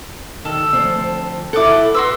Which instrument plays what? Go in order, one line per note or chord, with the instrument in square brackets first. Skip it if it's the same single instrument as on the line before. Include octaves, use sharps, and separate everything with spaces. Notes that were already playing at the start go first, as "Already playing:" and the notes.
[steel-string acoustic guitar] D#3 [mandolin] A4
[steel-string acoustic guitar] D2 F3 C4
[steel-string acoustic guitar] E4 A4 [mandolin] F#5 D6
[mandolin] F#4 C6 E6 [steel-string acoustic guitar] B4